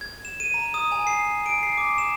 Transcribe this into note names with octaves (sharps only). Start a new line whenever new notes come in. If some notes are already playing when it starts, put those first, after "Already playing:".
G#6
E7
D#7
A#5
D#6
G#5
C7
D7
C7
D6
E7